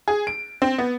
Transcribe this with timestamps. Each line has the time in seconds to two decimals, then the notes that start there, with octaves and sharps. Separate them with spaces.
0.08 G#4
0.27 D7
0.62 C4
0.78 B3